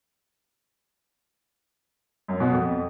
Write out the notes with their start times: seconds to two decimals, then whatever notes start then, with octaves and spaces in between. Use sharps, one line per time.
2.28 F#2
2.40 B2
2.52 F2